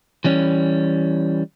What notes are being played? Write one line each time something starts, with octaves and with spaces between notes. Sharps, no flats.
E3 G3 C#4